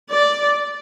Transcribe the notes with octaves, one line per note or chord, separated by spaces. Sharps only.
D5